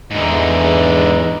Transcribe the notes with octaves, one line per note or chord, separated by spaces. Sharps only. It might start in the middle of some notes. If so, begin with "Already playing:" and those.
E2 G#2 D3 E3 D#4